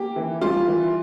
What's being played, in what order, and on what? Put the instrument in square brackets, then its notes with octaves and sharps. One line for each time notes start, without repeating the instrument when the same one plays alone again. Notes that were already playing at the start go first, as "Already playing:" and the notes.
Already playing: [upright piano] A#3 G4
E3
G3 F4
E3